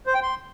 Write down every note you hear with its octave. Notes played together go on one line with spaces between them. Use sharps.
C5
G5
C6